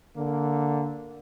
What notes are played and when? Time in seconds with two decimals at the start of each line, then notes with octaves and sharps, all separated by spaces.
0.16 D3 A#3